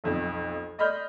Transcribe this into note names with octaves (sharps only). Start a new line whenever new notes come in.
B1 F2
D5 D#5 B5 C6 F6 G6